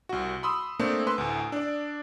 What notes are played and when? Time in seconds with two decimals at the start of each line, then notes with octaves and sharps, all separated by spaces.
0.09 C2 F#4
0.43 B5 C6 D#6 E6
0.79 A3 A#3 C4 D4
1.07 B4 C6 E6
1.18 D2 A2
1.52 D4 D5